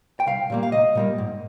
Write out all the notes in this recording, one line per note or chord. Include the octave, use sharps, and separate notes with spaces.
G5
C2 F5
A#2 G3 A#3
F5
C2 D#5
A#2 G3 A#3
G#2